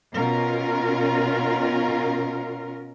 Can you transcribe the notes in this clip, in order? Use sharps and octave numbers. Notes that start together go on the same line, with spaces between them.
B2 C#4 F4 A#4